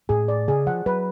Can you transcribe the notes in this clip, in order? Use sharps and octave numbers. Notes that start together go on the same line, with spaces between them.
A2 G#4
D5
C#3 G#4
F3 F#5
F#3 B4